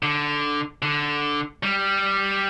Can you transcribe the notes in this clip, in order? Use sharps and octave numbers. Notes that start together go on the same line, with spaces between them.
D3
D3
G3